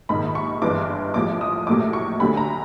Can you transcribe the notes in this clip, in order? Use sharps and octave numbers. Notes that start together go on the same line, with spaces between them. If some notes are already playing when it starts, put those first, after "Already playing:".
A#1 G#2 D#3 G#3 B5
C#6
G1 G2 E3 G#3 D6
A1 A2 F3 G#3 D6
D#6
A#1 A2 F#3 A3 D6
C#6
D2 D3 F#3 A3 B5
A#5